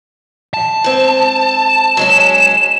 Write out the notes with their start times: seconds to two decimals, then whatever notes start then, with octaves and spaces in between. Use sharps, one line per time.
0.54 A5
0.84 G#2 C4
1.69 E7
1.97 F#3 G#3 C#4